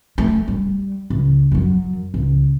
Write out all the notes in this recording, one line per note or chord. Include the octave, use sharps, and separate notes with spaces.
A3
G3
C#2
F#2 F#3
C#2